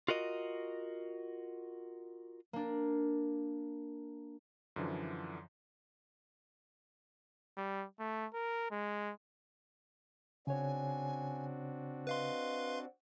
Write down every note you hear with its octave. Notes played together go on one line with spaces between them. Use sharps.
F4 F#4 A#4 D#5
A#3 D4
F#2 D3 E3 F3
G3
A3
A#4
G#3
C#3 C4 D4 F#4 C#5 G#5
B4 D#5 F5 C6